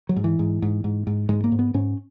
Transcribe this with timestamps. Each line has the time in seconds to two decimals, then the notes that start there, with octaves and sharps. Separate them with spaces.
0.09 F#3
0.16 G#2
0.24 E3
0.39 G#2
0.62 G#2
0.84 G#2
1.07 G#2
1.29 G#2 G#3
1.44 A#3
1.52 G#2
1.59 B3
1.74 G#2 C#4